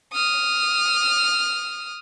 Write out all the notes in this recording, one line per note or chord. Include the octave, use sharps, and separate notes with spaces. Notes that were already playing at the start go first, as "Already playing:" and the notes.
D#6 F6